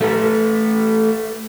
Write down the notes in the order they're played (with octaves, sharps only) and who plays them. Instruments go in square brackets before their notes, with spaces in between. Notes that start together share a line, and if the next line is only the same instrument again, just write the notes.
[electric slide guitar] A3 A4 B4